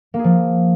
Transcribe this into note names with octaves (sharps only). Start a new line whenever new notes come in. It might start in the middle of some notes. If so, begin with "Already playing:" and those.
A#3
G#4
F3